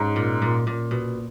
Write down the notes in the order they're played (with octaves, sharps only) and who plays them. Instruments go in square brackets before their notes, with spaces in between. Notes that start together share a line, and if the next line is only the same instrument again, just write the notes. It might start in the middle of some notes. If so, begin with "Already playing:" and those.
Already playing: [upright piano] G#2 [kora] C#4
[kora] A#2
A#2
A#2
B2